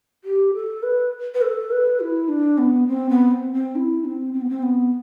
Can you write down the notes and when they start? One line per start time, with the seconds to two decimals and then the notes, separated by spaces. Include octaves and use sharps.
0.24 G4
0.54 A4
0.83 B4
1.34 B4
1.42 A4
1.71 B4
2.00 E4
2.29 D4
2.58 B3
2.88 C4
3.09 B3
3.31 C4
3.53 C4
3.75 E4
4.05 C4
4.33 C4
4.41 B3
4.49 C4
4.63 B3